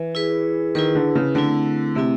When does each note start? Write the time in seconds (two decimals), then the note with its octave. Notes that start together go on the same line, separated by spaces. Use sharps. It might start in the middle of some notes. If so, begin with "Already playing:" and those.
Already playing: E3
0.15 E4 G#4 B4
0.75 D#3 E4 G#4 B4
0.95 D3
1.15 C#3
1.35 D3 A3 C4 E4
1.95 C3 A3 C4 E4